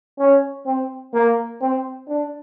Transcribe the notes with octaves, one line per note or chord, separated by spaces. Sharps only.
C#4
C4
A#3
C4
D4